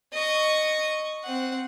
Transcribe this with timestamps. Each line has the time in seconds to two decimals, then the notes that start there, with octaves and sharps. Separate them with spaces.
0.13 D#5 C#6
1.23 C4 F#5